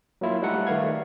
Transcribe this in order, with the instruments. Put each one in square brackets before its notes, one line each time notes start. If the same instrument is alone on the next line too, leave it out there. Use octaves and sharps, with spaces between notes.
[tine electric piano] F#3 A#3 E4 F4
G3 A3 D#4 A4 F#5
D#3 A3 B4 F5 G#6